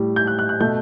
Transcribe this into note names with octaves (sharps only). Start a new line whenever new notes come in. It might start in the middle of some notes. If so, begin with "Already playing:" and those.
Already playing: A2 G3
G6
F#6
F#6
F#6
B2 A3 G6